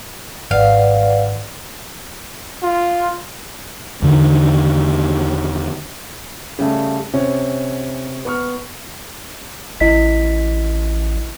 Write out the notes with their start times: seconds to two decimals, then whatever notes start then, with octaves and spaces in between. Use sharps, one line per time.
0.51 G#1 B4 D5 F5 F#5
2.63 F4
4.02 E2 D3 D#3
6.59 C#3 G3 A3
7.13 C3 C#4
8.25 B3 C#6 F6
9.80 A1 E4 D#5 B6